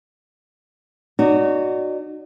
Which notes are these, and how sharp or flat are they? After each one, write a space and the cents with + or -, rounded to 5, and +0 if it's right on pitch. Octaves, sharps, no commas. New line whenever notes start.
D#4 -35 F#4 +0 D5 -35